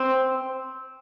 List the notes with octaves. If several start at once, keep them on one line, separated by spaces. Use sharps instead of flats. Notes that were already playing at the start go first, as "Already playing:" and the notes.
Already playing: C4